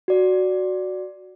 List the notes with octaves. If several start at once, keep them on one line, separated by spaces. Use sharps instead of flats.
F#4 D5